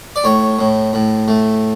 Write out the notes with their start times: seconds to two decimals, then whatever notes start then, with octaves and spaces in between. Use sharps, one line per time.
0.16 D5
0.24 A2 C#5
0.59 A2
0.93 A2
1.28 A3